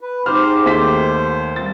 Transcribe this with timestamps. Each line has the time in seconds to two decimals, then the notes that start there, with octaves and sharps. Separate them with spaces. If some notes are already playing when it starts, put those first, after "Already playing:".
0.01 B4
0.26 G#2 G4 C5 F6
0.66 D#2 A3 C5 B6
1.56 G2 A6